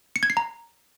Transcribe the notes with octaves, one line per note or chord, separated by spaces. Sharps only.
C#7
G#6
C7
A#5